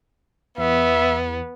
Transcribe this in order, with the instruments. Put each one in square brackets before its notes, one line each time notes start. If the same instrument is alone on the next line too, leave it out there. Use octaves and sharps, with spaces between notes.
[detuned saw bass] E2 [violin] B3 [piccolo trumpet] E5